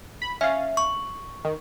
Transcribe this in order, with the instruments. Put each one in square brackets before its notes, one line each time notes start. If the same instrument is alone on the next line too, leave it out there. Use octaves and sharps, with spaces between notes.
[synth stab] B5
[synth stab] C#4 F5 [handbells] E5
[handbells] C#6
[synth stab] D#3